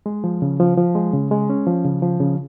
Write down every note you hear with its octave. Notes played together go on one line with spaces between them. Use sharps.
G#3
F3
C#3
F3
F3
G#3
C#3
G#3
C#4
F3
C#3
F3
C#3